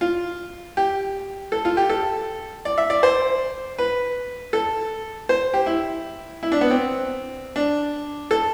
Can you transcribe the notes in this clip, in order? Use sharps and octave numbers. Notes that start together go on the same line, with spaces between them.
F4
G4
A4
F4
G4
A4
D5
E5
D5
C5
B4
A4
C5
G4
E4
E4
D4
B3
C4
D4
A4